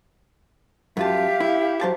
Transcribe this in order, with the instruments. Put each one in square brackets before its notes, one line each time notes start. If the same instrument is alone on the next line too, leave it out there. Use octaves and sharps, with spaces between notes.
[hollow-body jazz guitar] F#2 F4 A5 [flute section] G4 E5 F5
[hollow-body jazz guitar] E4
F#3 C5 A5